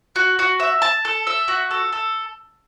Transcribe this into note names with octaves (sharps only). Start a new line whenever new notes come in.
F#4
F#4
E5
A5
A4
E5
F#4
A4
A4